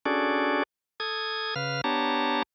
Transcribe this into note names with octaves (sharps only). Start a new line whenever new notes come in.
C#4 D4 F#4 G#4 A4 D5
A4 D#6 G#6
C#3 B4 F5 F6
B3 D4 G4 C#5 A5 A#5